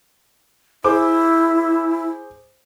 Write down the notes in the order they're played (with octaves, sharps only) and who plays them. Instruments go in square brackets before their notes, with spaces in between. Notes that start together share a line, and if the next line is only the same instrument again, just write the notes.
[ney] E4 [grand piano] G#4 C5 D6